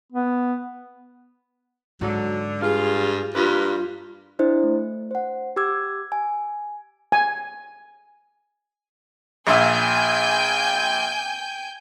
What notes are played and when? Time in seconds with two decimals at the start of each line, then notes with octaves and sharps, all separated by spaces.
0.12 B3
2.01 G#2 D3 F#3
2.61 G2 F4 G#4
3.34 G2 A#3 F4 B4
4.39 D4 E4 C5 D#5
4.63 A3
5.11 C5 F#5
5.56 G4 D6 E6 G#6
6.12 G#5
7.12 G#5
9.47 A#1 A#2 E5 G5 G#5 G6